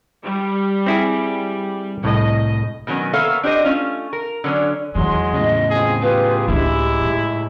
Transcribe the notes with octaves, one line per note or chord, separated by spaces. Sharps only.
G3
C4 E4 G#4
C2 A2 D#5
B2 D#3 F#3 C#4
A#3 B3 A4 C#5 E5 F5
D4 G4 C5 D#5
A3 C#4 F4
A#4
D3 F#3 C#4
E2 D#3 F#3 G#3 C6
A2 C#3 D#5
C4 F4 G#4
F4 G4 G#4 B4
C#2 G#3 D4 E4 G4
G#2